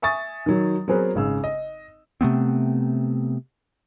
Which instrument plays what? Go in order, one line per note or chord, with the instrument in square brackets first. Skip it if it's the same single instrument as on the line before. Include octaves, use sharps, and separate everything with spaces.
[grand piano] E5 G#5 C#6 D#6 A6
D#3 F#3
F#3 B3 C4 G#4 A#4 B4
G#1 C#3 E6
D#5
[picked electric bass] C3 A3 B3 C4